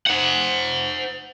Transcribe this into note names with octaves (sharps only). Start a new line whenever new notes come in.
C5 F#5